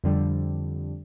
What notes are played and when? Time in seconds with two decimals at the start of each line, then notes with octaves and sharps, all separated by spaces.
0.04 F2 D3 G3